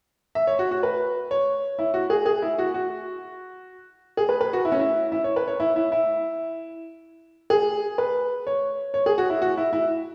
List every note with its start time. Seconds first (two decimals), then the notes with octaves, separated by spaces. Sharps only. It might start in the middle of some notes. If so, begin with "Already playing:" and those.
0.35 E5
0.47 C#5
0.59 F#4
0.71 F#4
0.83 B4
1.31 C#5
1.79 E4
1.94 F#4
2.10 G#4
2.26 G#4
2.42 E4
2.59 F#4
2.74 F#4
4.17 G#4
4.29 B4
4.41 B4
4.53 F#4
4.65 E4
4.72 C#4
4.79 E4
5.12 E4
5.24 C#5
5.36 B4
5.48 C#5
5.60 E4
5.76 E4
5.92 E4
7.50 G#4
7.98 B4
8.47 C#5
8.94 C#5
9.06 G#4
9.18 F#4
9.30 E4
9.42 F#4
9.57 E4
9.73 E4